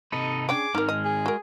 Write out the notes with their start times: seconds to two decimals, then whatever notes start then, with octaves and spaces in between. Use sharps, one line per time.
0.12 C3 D#4 A4 B4 D#5
0.49 C#4 D4 G#4 G5 D6
0.75 G#2 D#3 G#3 D#4 A#4 F6
0.89 D#5
1.05 G#4
1.26 F#4 A#4